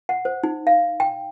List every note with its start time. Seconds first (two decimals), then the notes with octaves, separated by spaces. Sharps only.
0.09 F#5
0.25 C5
0.43 D#4
0.67 F5
1.00 G5